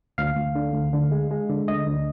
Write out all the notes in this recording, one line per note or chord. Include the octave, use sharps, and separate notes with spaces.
D2 F5
D2
D3
D2
D3
G#3
G#3
D3
D2 D#5
D2